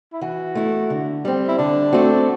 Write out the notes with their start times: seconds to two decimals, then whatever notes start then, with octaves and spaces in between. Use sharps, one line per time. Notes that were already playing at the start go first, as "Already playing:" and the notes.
0.13 E4
0.21 E3 F#4
0.55 A3 E4
0.90 D3
1.25 G3 C4
1.48 E4
1.58 D3 D4
1.92 A3 C4 F#4